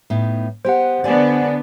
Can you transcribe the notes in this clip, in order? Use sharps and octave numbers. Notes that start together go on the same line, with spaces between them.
A2 B3 D#4
B3 G4 C5 F#5
D3 B3 D4 D5 G#5